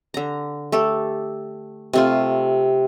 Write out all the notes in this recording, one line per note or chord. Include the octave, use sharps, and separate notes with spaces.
D3 A#5
A3 G4 A4
C3 A3 F4